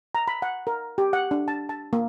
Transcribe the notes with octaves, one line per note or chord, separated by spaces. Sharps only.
A#5
B5
F#5
A#4
G4
F#5
D4
A5
A5
A#3